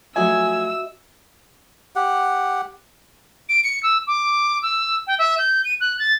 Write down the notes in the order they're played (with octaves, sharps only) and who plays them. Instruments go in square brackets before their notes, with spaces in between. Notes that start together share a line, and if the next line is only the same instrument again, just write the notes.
[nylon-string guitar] F3 F#3 A3 [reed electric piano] F#4 D#5 E5 [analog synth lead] G#5 [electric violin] E6
[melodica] G4 F#5
[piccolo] D7
C#7
E6
D6
E6
G5
E5
G6
D#7
F#6
A6